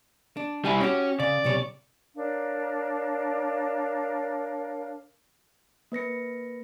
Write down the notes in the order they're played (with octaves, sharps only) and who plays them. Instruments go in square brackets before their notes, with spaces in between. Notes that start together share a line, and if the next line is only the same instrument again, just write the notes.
[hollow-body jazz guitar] D4
[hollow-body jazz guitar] C2 G#5 [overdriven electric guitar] G3 E4
[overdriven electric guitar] C#4 [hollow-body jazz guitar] F#4 G4
[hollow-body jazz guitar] C#3 [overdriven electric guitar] D5
[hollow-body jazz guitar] B1 C3 C#5
[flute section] D4 A#4 C#5 F5
[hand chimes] A#3 B4 A#6 C#7